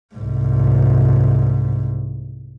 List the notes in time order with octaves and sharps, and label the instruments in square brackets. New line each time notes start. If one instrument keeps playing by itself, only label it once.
[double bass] C2 G#2